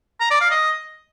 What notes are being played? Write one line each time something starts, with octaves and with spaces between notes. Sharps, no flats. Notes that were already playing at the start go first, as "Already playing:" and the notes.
A#5
D5
F5
D#5